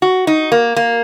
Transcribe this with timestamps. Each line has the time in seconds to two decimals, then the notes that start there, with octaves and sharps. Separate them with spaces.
0.02 F#4
0.27 D#4
0.52 A#3
0.76 A#3